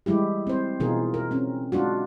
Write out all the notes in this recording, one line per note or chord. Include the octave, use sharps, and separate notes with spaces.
E3 G3 G#3 E4 G4
C4 C5
B2 E3 D#4 F4 G#4 A#4
A#4
C4 C#4
G#3 D4 F4 F#4